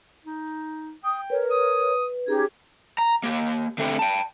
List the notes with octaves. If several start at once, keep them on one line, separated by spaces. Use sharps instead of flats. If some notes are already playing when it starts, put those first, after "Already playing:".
D#4
G5 D#6
A#4 B4 C#5
D#6
C#4 D#4 G4 G#4 G#6
A#5
A#3 G4
D3 A3 C4 E4 G4
G5 A5